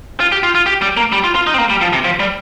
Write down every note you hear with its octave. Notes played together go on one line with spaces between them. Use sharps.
F4
G4
F4
F4
G4
G3
A#3
G3
F4
F4
D#4
C4
A#3
G3
F3
C3
F3
G3